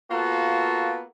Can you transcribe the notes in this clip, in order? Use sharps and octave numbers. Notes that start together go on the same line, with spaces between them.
A#3 B3 F4 F#4 A4